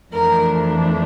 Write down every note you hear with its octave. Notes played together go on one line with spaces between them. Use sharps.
F2 E3 A3 D4 A#4